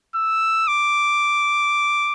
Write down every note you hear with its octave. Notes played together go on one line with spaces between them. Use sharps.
E6
D6